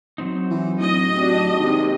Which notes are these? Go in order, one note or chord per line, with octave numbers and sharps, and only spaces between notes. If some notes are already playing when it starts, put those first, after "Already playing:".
F#3 C4 D#4
E3
D1 D#5
D4 F#4 G4
D#2 C3 D#3 G#3